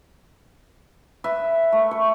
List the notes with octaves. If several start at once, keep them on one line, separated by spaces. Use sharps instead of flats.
B4 E5
A3
C#6